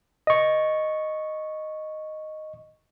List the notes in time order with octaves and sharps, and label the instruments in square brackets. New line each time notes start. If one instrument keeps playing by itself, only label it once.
[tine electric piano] D#5 C#6